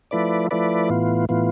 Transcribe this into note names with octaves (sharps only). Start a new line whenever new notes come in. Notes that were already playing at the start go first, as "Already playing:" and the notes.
F3 A3 E4 B4 D5
F3 A3 E4 B4 D5
A2 E3 B3 F4
A2 E3 B3 F4